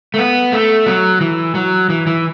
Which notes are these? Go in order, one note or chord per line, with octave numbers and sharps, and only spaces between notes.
A3
B3
A3
F#3
E3
F#3
E3
E3